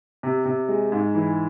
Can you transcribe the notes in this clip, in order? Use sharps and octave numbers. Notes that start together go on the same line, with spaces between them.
C3
C3
G#3
G#2
E3